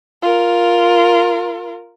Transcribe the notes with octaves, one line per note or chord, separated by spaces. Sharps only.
F4 A#4